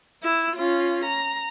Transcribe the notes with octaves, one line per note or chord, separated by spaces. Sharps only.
E4
C#4 F4
A#5